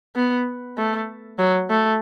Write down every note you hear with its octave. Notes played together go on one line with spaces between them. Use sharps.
B3
A3
F#3
A3